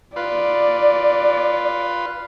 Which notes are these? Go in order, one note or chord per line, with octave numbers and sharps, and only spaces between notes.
F4 B4 D5